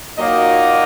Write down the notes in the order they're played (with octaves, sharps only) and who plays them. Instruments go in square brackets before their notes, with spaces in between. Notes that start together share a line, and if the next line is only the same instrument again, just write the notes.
[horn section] A#2 F#3 A#3 [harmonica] D#4 D#5